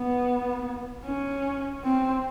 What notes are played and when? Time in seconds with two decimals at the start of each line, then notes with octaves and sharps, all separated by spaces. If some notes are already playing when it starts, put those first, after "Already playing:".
Already playing: B3
1.05 C#4
1.84 C4